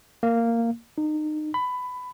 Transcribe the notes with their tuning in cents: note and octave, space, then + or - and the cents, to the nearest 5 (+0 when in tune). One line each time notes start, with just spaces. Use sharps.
A#3 -10
D#4 -30
B5 +15